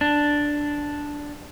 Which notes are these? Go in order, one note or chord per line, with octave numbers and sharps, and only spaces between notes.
D4